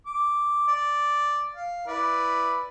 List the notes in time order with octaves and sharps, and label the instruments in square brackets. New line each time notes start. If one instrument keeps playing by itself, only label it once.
[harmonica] D6
D5
F5
E4 B4 D5